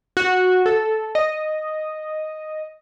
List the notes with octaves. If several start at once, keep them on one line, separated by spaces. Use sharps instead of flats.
F#4
A4
D#5